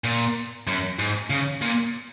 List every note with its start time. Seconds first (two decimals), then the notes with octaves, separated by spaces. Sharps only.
0.04 A#2
0.67 F#2
0.99 G#2
1.30 C#3
1.62 A#2